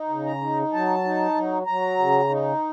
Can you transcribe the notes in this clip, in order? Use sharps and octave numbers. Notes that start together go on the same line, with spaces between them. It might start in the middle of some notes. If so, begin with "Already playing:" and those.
Already playing: D#4
C#3
A#5
D#4
F#3 A5
D#4
F#3
F#3 A#5
C#3
D#4